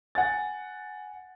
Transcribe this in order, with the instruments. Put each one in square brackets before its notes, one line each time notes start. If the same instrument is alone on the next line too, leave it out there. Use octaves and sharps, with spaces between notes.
[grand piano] F#5 G#5 A6